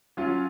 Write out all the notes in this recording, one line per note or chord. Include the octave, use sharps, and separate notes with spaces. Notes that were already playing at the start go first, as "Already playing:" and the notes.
F#3 C#4 F4